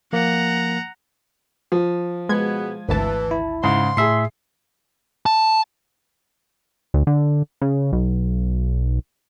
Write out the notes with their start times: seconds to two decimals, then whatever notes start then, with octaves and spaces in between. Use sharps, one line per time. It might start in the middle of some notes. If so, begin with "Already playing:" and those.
0.13 F3 A#3 F#5 A#5
1.72 F3
2.29 B2 G#3 B3 G#6
2.88 G#1 D2 E3 A5
3.31 E4
3.64 G#2 C#3 C6
3.97 A2 G#4 E5 C7
5.26 A5
6.94 D2
7.07 D3
7.61 C#3
7.93 B1